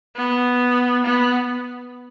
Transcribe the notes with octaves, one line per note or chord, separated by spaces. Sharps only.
B3
B3